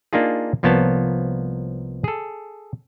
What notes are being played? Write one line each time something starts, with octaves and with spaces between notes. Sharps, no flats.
A#3 D4 D#4 F4 G#4
C2 F3 A#3 B3 C#5 A5
G#4 A4